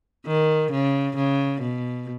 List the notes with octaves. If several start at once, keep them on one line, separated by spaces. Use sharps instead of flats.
D#3
C#3
C#3
B2